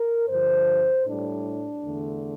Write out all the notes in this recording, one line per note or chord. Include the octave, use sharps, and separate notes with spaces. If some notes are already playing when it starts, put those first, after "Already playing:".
Already playing: A#4
G2 D3 F3 C5
A2 G3 D4
E2 D3 A3